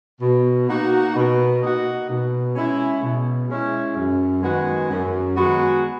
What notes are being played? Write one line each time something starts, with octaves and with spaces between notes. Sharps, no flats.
B2
A#3 D#4 F#4
B2
A#3 D#4 F#4
B2
G#3 C#4 E4
B2
G#3 C#4 E4
F#2
D#3 G#3 B3 F#4
F#2
D#3 G#3 B3 F#4